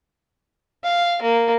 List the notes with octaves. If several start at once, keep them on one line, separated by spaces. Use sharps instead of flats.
F5
A#3